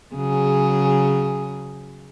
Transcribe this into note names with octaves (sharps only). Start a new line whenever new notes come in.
C#3 F#3 G#4